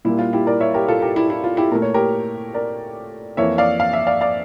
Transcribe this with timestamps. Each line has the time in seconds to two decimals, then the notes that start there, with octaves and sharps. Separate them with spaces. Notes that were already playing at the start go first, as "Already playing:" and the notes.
0.05 A#2 G3 A#3 E4
0.19 F4
0.33 E4 G4
0.47 A#4 D5
0.61 C#5 E5
0.74 G4 A#4
0.88 F4 A4
1.02 G4 A#4
1.16 E4 G4
1.30 E4
1.44 F4
1.57 E4 G4
1.72 A#2 A3 A#4
1.82 C#5
1.94 G4 A#4
2.54 A#4 D5
3.37 F2 E3 A#3 C#5 E5
3.58 D5 F5
3.80 F5
3.93 E5
4.07 D5 F5
4.21 D5 F5